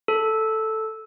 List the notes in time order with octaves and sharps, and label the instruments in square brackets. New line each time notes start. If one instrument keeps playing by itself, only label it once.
[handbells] A4